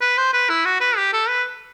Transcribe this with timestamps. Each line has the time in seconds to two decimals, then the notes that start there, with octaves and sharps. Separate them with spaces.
0.01 B4
0.18 C5
0.33 B4
0.49 E4
0.65 F#4
0.81 B4
0.97 G4
1.13 A4
1.29 B4